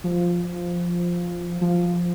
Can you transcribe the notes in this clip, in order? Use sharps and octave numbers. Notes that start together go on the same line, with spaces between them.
F3
F3